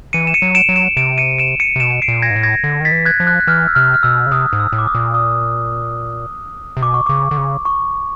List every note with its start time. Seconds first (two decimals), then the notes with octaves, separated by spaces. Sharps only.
0.13 E3 C#7 D#7
0.27 E7
0.34 C#7 D#7
0.42 F#3
0.55 D7 E7
0.69 F#3
0.76 D7 E7
0.97 C3 D7 E7
1.18 C#7 D#7
1.38 D7 E7
1.60 C#7 D#7
1.76 C3
1.80 B2 D7 E7
1.91 C#7
2.02 C7 D7
2.08 A#2
2.22 G#6 A#6
2.30 G#2
2.36 A2
2.43 G#6 A#6
2.64 D3
2.80 D#3 A6 B6
2.92 E3
3.05 F#6 G#6
3.20 F3
3.27 F#6
3.40 F#6
3.47 E3 F6
3.68 E6
3.75 C3 F6
3.94 F6
4.03 B2 E6
4.26 C#3
4.32 C3 D#6
4.53 G#2
4.60 E6
4.73 A2
4.78 D6
4.87 D#6
4.95 A#2
5.14 D#6
6.77 C3
6.82 B2 D6
6.94 C#6
7.06 C#3 D6
7.31 D3
7.37 C#3
7.65 C#6